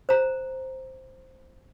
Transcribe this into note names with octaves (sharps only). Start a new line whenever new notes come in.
C5 A#5